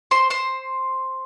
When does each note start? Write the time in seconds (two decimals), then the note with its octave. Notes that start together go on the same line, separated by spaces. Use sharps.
0.11 C5 C6
0.30 C5 C6